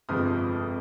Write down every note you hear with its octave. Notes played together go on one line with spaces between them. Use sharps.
G1 F2 C3 F3 G#3 D#6 F6